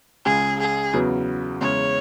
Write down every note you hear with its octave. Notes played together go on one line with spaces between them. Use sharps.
C#2 C#3 G#3 C#4 G#4
G#4
E2 C#3 F#3 B3
E2 C#3 G#3 C#4 C#5